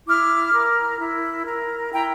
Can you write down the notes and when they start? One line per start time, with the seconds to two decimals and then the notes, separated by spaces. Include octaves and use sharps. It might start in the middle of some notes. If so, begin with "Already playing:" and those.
0.07 E4 D6 F6
0.53 A#4
0.99 E4
1.46 A#4
1.93 E4 G5 A#5